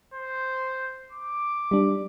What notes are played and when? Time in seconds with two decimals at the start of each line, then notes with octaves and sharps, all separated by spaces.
0.14 C5
1.12 D6
1.71 G3 D4